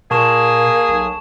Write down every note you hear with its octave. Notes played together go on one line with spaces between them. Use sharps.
A#2 A#3 G#4 A5 C#6 E7
B1